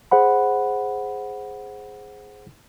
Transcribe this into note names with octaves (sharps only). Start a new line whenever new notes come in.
G#4 C5 F#5 B5